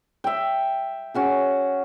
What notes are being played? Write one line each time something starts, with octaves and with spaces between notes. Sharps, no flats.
E5 G5
C#4 F#4 G#4